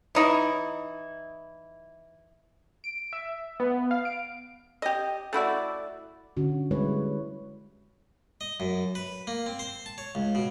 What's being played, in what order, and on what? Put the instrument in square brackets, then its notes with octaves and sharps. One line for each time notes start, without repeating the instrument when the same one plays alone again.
[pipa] E3 D#4 E4
[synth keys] D7
E5
B3
F5
D7
[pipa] G4 D#5
A3 E4 F#4 D5
[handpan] D3 C#4 F#4
G3 G#3 E4 B4 C#5
[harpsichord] D#5
F#2
B4
A#3
C4
C5
A5
C#5
C#2
B2